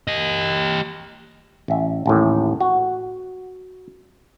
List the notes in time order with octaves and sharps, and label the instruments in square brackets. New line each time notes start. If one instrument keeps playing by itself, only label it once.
[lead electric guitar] G4 D#5
[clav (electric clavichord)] A1 E5
A1 D#2 A2
F#4